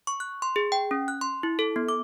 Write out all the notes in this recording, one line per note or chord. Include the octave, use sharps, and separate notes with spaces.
C#6
F#6
C6
G#4
G5
C#4
F#6
C6
E4
A4
B3
D6